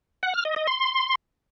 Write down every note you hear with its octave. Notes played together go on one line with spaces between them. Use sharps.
F#5
F6
D#5
D#5
C6